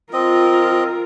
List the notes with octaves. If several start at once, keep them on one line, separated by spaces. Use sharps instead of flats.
C4 F4 A#4 D#5